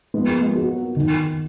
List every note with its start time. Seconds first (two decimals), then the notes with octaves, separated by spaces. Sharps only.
0.14 F3 G#3 B3
0.29 A#3
0.41 F3 G#3
0.55 F#4
0.68 F#3 A#3
0.96 D#3